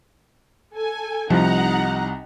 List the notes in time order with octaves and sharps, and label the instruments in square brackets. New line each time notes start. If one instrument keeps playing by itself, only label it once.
[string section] A4 G#5
[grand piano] C2 [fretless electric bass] F3 [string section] D#4 F#5 A#5